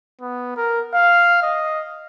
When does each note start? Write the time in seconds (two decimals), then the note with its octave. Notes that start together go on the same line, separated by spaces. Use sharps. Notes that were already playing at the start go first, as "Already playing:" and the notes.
0.21 B3
0.57 A#4
0.94 F5
1.43 D#5